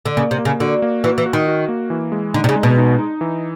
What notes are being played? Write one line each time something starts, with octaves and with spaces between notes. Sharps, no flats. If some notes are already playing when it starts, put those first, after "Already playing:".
D3
C#3 A#3
C3
A#3
C#3
D3 F#4
A#3
E3 F#4
E3
F#4
D#3
F#4
A#3
E3
G#3
D3 D#4
C3
C#3
G#3
B2
D#4
D#4
E3